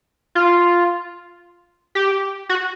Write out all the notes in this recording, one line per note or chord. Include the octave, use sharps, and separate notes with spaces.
F4
G4
F#4